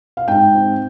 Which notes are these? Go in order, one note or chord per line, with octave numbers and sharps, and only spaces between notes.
F5
G#2 G5
C4